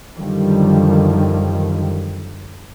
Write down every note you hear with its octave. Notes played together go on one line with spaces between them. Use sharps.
F#2 D3 D#3 F3 G3